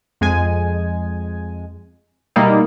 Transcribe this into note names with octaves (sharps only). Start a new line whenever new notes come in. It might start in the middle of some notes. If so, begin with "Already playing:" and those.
F2 G#3 G#5
B2 G3 A#3 D#4 E4